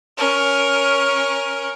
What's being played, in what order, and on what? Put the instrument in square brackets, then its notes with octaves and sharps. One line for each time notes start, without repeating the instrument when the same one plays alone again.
[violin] C#4 A#4